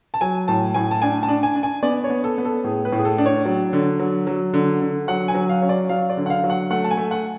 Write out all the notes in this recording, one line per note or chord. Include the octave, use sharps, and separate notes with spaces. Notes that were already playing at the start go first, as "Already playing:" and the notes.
A5
F#3 G#5
A2 A5
A2 G#5
A5
D4 G#5
A5
D4
G#5
D4
G#5
B3 D5
C#5
B3
A4
B3
A4
A2 G#4
B4
A2
G#4
A4
D4
C#5
F#3
D3
F#3
F#3
D3
D3
F#3 F#5
G#5
F#3
F5
C#4
D5
F#3 F5
D5
D3
F#5
F5
F#3
F#5
A3 F#5
A5
G#5
A3
F#5